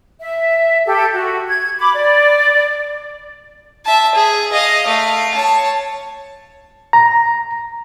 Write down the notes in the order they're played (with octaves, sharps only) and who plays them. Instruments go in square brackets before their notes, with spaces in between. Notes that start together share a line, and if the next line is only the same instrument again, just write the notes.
[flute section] E5
G4 A4
F#4
G#6
B5 D6
D5
[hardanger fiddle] E5 A5
G#4
D#5 F5
A3 F5
C#5 A5
[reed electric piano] A#5